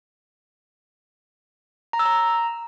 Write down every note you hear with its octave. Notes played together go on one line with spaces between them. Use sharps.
A#5
E6
A#5